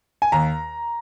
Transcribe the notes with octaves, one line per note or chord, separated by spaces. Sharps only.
G#5
D#2 A#5